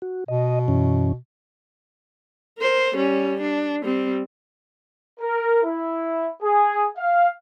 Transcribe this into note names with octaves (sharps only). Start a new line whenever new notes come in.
F#4
B2 D#5
F#2 E3 C#4
A#4 C5
G3 C#4
D4
G3 C4
A#4
E4
G#4
F5